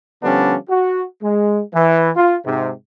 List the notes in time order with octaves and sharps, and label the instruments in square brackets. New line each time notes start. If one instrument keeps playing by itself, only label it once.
[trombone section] D3 F3 G3 B3 C#4 D4
F#4
G#3
E3
F4
G#2 C3